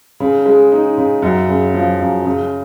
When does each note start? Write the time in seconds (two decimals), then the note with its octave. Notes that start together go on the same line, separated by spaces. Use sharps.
0.20 C#3
0.46 G#3
0.72 D#4
0.98 C#3
1.22 F#2
1.49 C#3
1.74 F3
2.00 F#2
2.25 C#3